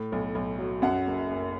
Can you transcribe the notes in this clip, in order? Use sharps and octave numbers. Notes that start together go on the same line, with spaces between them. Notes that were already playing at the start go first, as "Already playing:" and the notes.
Already playing: A2
B1
B1
F#3
F#2 F#5
F#1
F#1